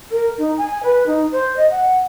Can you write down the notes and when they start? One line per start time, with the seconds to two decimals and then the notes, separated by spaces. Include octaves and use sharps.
0.11 A#4
0.38 D#4
0.57 G#5
0.83 B4
1.06 D#4
1.31 C5
1.56 D#5
1.70 F#5